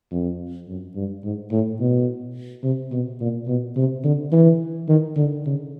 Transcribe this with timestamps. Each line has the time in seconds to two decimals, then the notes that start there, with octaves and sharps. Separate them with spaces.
0.12 F2
0.68 F#2
0.96 G2
1.24 G#2
1.51 A2
1.80 B2
2.64 C3
2.92 B2
3.21 A#2
3.48 B2
3.76 C3
4.04 D3
4.32 E3
4.88 D#3
5.16 D3
5.46 C#3